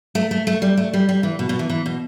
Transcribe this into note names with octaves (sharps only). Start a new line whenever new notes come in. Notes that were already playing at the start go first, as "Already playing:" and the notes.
A3
A3
A3
G3
A3
G3
G3
E3
B2
B2
E3
E3
B2